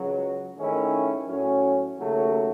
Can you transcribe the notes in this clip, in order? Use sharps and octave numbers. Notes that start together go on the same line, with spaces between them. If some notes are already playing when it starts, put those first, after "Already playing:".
Already playing: C#2 C#3 F#3
G#2 D#3 A3 C#4 E4
A2 F#3 C#4
D#2 C#3 F#3 A3